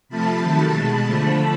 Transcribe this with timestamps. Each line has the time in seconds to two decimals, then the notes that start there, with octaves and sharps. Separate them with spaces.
0.09 C3 F3 A3 A5 B5
0.41 C3 D#3 F#3 A3 A5 B5
0.73 B2 G#3 A5 B5
1.05 D3 F3 A3 A5 B5